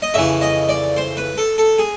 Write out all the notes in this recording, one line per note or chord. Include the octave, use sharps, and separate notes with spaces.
D#5
F2 C#3 E3 E5
D#5
D5
C5
B4
A4
A4
G#4